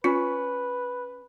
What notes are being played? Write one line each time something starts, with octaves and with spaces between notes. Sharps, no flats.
C#4 F4 B4